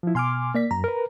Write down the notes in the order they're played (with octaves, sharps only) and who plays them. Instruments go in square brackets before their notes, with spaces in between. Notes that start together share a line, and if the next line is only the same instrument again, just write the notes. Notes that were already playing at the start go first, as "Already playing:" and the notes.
[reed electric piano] F3 E4
[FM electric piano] B2 G#5 F6 [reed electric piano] C6 D6
[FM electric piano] A#3 D5 B6
[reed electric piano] F#2 [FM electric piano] A#5
[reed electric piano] A#4 B4